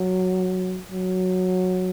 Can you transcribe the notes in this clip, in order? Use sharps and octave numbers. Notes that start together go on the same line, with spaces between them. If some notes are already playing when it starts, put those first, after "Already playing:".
Already playing: F#3
F#3